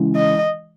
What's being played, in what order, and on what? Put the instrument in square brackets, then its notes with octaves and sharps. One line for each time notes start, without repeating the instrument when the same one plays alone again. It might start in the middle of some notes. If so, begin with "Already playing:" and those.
Already playing: [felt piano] C#3 E3 G#3
[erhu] D#5